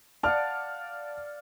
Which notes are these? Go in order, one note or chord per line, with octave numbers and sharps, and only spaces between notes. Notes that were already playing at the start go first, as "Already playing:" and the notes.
D5 F5 F#5 A5 F6